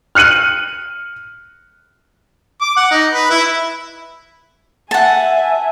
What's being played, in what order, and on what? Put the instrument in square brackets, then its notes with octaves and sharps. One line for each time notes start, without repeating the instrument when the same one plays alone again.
[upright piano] F6 F#6 C#7 D#7 F#7
[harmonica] D6
F#5
D#4
B4
E4
[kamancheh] E5 G#5 [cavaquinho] F#5 A5